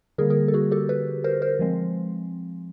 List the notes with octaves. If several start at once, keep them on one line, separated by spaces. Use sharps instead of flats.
D3 G3 A#3 G#4 A#4
G#4 A#4
A4
F#4 G#4
G4 A4
A4 B4
A#4 C5
A#4 C5
F3 G#3 C4